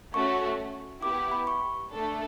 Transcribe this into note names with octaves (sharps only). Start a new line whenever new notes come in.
A3 C#4 F#4 C#6
B3 E4 G4 D6
B5
C#6
A3 D4 A4